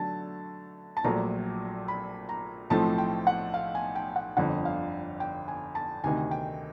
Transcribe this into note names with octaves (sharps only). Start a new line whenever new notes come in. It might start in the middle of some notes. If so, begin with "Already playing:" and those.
Already playing: D3 F#3 A3 A5
A5
A#1 A#2 F#3 A3 A#5
B5
A#5
B1 A2 F3 A3 C4 A5
G5
F#5
F5
G#5
G5
F#5
G1 F2 D3 F#5
F5
G5
G#5
A5
D2 C3 D#3 G#5
G5